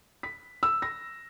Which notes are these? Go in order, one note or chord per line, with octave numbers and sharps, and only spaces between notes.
B6
E6
A#6